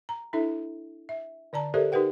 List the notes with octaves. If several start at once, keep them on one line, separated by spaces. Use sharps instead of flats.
A#5
D4 E4 A4 E5
E5
D3 D5 A5 A#5
G4 A4 A#4 C5 D5 E5
D#4 G4 A#4 B4 F#5 G5